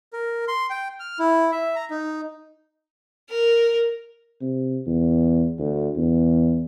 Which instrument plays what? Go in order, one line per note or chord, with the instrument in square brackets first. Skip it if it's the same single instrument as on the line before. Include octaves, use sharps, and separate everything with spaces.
[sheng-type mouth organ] A#4
C6
G5
F6
E4
E5
A#5
D#4
[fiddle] A#4
[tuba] C3
E2
D2
E2